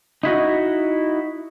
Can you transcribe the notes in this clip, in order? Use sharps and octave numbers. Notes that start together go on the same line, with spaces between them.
D#4 E4 F#4 D#5